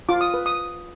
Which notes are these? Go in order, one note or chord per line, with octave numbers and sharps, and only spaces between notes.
F4 D6
D#6
B4
D#6